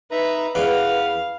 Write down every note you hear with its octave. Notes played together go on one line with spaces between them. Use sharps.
D#4 B4 E5 A#5
E2 C#4 B4 D5 F5 F#5